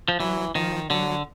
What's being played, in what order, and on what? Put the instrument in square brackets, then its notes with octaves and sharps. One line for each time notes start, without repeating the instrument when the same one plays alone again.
[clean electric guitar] F3
[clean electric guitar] E3 [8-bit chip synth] F#3
[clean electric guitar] D#3 [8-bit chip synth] F3
[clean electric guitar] D3 [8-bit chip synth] F#3